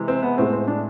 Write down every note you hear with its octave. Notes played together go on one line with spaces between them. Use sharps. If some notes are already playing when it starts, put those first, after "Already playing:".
Already playing: C3 E3 G#3
C4
B3
A2 G#3 C4
C4
D4